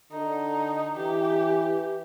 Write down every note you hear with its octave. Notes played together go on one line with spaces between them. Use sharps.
D3 D#4
E3 G4